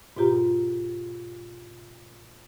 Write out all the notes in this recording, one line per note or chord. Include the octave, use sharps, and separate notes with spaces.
G#2 B2 F4 G4 A#5